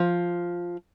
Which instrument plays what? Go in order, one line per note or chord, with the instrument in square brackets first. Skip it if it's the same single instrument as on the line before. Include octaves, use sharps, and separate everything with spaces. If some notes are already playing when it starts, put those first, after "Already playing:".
Already playing: [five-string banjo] F3